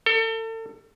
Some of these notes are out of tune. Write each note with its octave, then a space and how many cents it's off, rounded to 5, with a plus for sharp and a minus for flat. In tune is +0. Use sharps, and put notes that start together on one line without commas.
A4 +35